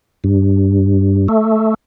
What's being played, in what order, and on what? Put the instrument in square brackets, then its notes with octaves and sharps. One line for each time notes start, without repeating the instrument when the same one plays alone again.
[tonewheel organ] G2
A3